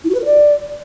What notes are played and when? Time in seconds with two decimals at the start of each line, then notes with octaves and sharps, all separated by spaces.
0.04 E4
0.09 F#4
0.14 B4
0.20 A#4
0.25 D5